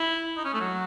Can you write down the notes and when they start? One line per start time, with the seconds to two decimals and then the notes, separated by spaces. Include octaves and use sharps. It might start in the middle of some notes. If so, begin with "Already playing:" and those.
Already playing: E4
0.37 D#4
0.45 C#4
0.54 A3
0.60 F#3